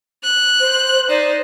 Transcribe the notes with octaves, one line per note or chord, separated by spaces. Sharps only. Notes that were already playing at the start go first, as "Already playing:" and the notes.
F#6
C5
D#4 C5 D5